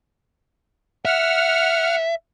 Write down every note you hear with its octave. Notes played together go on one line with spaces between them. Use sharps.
E5 F#5 F6